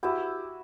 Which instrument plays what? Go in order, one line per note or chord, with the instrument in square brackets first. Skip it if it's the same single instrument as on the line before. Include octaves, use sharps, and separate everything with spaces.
[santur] E4 G4 B4 E5 [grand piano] F#4